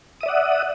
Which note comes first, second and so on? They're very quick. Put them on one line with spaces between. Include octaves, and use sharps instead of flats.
D#6 E5 D5 F#5